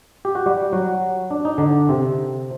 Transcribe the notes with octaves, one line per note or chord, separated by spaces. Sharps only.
G4
F#4
G3 G4
F#3 F#4
D4
D#4
D3 D4
C3 C4